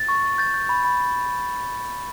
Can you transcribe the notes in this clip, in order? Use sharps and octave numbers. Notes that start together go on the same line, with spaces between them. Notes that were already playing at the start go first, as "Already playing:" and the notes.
Already playing: A6
C#6
C#6
G6 A6
G6
B5
B5